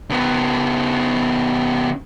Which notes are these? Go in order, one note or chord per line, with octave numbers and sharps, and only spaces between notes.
C#3 B3